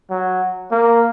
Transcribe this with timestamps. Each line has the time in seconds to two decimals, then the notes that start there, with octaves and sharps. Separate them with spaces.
0.10 F#3
0.71 A#3